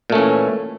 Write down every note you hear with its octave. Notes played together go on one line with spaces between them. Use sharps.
A#2 E3 A3 C#4